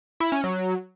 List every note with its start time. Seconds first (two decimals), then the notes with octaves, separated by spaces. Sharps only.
0.20 E4
0.32 C#4
0.44 F#3